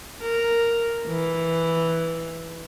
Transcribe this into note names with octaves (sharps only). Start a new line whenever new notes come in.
A#4
E3